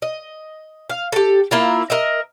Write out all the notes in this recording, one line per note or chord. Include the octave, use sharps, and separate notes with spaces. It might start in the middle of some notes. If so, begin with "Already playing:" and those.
D#5
F5
G4 A4
A#3 E4 F4
A#4 D#5 E5